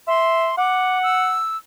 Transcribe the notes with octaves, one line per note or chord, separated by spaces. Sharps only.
E5 C6
F#5 D6
E6